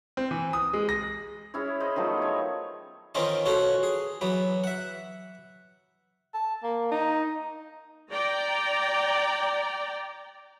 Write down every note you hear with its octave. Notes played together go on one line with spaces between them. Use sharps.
C4
E3
D#6
G#3
A#6
C#4 E4 G#4 C#5
C5 D#5 B5
D#3 F3 F#3 A3
B3 C#5
D#3 E3 C4 C#4 F4 D#5
B2 C#4 F4 F#4 A4
G#4
E3 F#3 B3
E5 F#5
A5
A#3
D#4
D5 G5 A#5